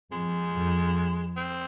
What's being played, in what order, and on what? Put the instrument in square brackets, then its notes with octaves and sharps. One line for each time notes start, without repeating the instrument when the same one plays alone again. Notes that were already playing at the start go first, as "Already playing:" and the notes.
[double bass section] F2 [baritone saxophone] G#3
[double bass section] F2
[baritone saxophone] C4